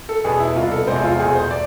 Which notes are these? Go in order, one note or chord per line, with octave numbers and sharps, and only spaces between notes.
A4
E2 B2 B3 G#4
E4
C2 B2 B3 F4
A4
E2 C3 G#3 C4 C5
F4
E2 B2 A3 G#4
C5
D5